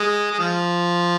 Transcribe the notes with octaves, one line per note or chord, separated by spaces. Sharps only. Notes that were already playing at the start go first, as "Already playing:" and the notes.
Already playing: G#3
G#3
F3